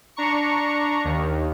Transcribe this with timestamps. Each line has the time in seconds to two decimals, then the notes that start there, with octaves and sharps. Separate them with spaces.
0.16 D4 A#5 C#6 C#7
1.04 D#2